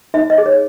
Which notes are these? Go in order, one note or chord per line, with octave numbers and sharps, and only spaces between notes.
D#4 E5
D#5
G#4
C#5